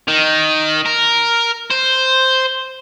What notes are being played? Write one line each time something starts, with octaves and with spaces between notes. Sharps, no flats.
D#3
A#4
C5